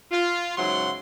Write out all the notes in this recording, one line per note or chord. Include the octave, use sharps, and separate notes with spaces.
F4
G#2 C#3 E3 F#3 F#5 C6